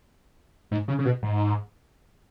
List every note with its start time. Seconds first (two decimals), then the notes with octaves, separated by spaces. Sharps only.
0.71 G#2
0.88 C#3
0.99 C#3
1.05 B2
1.22 G#2